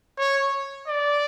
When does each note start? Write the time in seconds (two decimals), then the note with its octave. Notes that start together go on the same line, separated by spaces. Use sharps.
0.19 C#5
0.88 D5